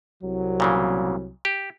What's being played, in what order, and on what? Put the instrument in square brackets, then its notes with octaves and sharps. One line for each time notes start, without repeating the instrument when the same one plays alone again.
[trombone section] C2 F#3
[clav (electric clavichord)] A#2 C#3 E3
G4